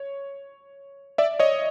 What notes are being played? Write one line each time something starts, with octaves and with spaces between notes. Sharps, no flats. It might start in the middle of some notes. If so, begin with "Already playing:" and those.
Already playing: C#5
D5 E5
C#5 D#5